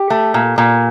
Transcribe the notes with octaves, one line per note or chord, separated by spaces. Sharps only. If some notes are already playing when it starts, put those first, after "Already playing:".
Already playing: G4
A3
A#2
A#2